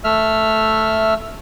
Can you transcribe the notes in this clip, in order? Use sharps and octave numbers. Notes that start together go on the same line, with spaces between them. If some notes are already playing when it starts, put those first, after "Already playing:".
A3 E5 F6